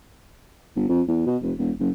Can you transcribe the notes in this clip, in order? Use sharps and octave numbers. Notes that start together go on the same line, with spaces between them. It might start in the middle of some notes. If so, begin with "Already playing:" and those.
G1
F2
E2
B2
F1
E1
F#1